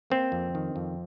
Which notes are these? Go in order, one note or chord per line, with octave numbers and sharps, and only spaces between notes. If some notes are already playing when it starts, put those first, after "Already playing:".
A#3 C4
F2
D#3
F2